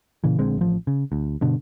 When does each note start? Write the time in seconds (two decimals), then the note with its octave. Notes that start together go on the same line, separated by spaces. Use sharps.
0.24 A#2 C#3 E3
0.38 A#1 D3 G#3 C4
0.58 A1 F3
0.87 C#3
1.12 D2
1.41 G2 B2 D3